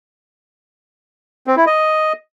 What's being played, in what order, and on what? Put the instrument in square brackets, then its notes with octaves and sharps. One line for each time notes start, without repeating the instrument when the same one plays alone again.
[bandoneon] C4
E4
D#5